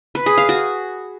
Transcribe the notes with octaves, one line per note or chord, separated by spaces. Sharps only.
B4
G#4
F5
F#4